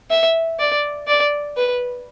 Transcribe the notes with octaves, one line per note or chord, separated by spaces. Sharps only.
E5
D5
D5
B4